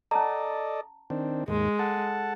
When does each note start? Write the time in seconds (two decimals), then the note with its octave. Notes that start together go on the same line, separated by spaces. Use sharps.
0.11 C#4 A4 D5 D#5 A5 A#5
1.10 D#3 C4 D4
1.48 D#2 G#2 G#3
1.79 A4 F#5 A5